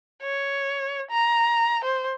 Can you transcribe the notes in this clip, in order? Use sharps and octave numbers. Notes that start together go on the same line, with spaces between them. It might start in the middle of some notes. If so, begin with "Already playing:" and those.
C#5
A#5
C5